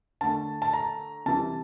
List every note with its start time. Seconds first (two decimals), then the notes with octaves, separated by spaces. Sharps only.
0.21 D3 A3 A5
0.62 A5
0.73 A#5
1.26 C3 E3 G3 A5